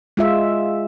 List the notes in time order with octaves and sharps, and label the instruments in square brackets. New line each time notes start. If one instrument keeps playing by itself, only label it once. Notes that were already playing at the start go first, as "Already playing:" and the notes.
[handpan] G#3 F4 E5